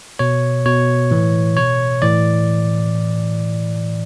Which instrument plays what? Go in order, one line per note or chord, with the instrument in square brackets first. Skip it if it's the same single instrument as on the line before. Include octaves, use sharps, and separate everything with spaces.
[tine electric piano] B2 C#5
B2 C#5
A2 E3
B2 C#5
A2 E3 D5